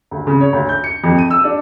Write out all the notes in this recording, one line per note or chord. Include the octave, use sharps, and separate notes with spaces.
D2
C#3
C#5
D2
G6
C#7
F2
D#7
E6
D4